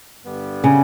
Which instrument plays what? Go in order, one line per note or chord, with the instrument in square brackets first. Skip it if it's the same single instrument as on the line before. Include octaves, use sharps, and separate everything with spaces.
[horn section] G2 D3 G3 B3
[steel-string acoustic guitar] C#3